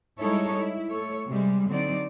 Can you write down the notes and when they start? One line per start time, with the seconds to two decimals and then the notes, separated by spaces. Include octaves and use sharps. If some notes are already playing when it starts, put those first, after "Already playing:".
0.18 G3 G#3 D#4 E4 A4 C#5
0.56 E4
0.89 A3 A4 C#5
1.27 C3 G3 G#3
1.68 D3 F#3 C4 D#4 D5